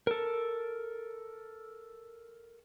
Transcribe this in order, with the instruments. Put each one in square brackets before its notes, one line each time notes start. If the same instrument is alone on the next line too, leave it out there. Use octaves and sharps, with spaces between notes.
[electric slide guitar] A4 A#4